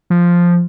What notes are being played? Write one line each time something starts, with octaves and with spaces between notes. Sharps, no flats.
F3